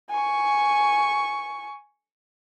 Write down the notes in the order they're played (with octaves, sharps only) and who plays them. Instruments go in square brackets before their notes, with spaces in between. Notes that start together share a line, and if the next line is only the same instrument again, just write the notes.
[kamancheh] G#5 C#6